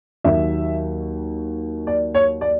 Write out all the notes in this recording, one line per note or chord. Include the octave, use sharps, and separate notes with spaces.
D#2 D#3 F#3 E5
D5
C#5
D5